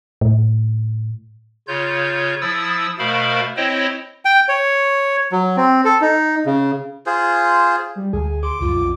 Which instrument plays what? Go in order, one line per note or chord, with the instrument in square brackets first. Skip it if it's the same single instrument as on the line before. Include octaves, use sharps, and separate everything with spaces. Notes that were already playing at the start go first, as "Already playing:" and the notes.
[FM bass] A2
[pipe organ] C#3 F4 C#5 G6
F3 E4 D#6 E6 A6
B2 A3 A#4 C5 F5 B5
C4 E4 C5 C#5 D#5 G5
[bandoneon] G5
C#5
F#3
C4
A4
D#4
C#3
[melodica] F4 G#4 C5
[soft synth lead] G3
[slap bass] D2 [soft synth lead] G#4
[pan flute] C6 [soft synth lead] D6
[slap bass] C#2 F#2 G3 [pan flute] F4
[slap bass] B1 F2 B2